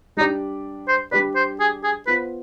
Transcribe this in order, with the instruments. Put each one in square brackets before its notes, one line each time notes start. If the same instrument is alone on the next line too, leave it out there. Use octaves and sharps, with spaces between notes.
[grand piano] G3 D4 G4 D5 [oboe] D#4
[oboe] C5
[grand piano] G3 D4 G4 D5 [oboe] B4
[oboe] C5
G#4
G#4
[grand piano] B3 F4 C5 [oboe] B4